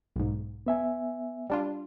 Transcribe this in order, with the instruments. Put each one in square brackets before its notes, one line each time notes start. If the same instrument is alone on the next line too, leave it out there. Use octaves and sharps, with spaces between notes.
[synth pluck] B1 G#2
[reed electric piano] B3 E5 G#5
[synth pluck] G3 D4 F4